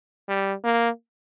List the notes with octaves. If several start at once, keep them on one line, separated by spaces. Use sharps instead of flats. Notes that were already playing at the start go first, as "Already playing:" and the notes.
G3
A#3